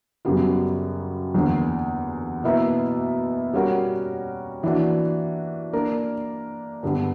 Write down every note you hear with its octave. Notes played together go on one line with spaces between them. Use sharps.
F#2 C#3 G3 B3 F#4
E2 D3 A#3
B2 A#3 E4 B4 E5
G3 C#4 F#4 A#4
E3 A#3 D4 F#4
A#3 D4 A#4
G2 D3 G3 B3